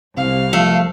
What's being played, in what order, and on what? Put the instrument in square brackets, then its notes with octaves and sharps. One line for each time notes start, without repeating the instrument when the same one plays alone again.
[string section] C2 [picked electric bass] C3 [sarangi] F5
[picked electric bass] F3 [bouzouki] A3